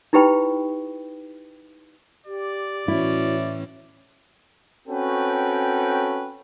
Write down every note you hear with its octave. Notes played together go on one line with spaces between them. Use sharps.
D#4 E4 G4 B4 G5 B5
G4 D5
A2 E3 C#4 E4 F#4
C4 C#4 F#4 A4 B4 G5